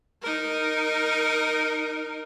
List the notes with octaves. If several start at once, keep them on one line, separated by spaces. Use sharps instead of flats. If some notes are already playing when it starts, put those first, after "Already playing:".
D#4 A#4